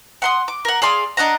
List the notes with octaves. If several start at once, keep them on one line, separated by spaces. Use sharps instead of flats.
F#5 C6 D#6
D6
A#4 F#5
G#4 D5 F5 C6
D4 D#5 F#5 A#5